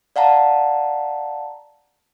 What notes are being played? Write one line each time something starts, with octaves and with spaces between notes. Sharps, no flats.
D5 F5 F#5 A5 A#5